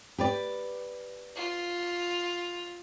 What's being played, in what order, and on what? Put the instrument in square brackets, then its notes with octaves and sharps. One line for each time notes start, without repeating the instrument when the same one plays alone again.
[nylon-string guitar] G4 B4 D5
[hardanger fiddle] F4